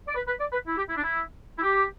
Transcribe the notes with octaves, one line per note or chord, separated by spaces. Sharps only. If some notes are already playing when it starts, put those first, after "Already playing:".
D5
B4
B4
D5
B4
E4
G4
E4
D4
E4
E4
G4